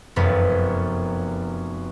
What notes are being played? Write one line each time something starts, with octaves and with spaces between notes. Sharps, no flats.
F1 F#2 F#3 B3 B4